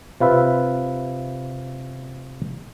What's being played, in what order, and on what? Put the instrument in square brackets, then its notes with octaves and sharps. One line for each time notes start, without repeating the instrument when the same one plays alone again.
[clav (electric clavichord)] C3 F4 B4 E5